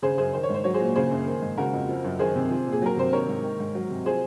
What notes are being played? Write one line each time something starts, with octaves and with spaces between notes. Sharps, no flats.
C#3 G#4 C5
F#2 G#4 C5
D#3 C5
C#5
G#2 C5
F#3 C#5
G#4 C5
A#2
C#3 G#4 C5
F#2
D#3
G#2
C#3 F#4 A#4
F2
F3
F#2
D#3 G#4 C5
C3
F3
A#2
G#4
F#3 A#4
C3 C5
D#3 A#4 C#5
G#2
D#3
G#2
F#3
C3
F3 G#4 C5